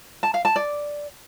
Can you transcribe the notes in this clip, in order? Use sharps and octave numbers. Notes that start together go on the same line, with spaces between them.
A5
F5
A5
D5